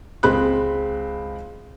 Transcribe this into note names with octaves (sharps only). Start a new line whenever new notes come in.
C#2 G#3 C4 G#4 B5 F#6